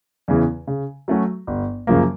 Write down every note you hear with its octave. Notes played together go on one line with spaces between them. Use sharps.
E2 C#3 E3
C#3
F#3 A3 C#4 F#4
G1
F#2 C#3 F3 A#3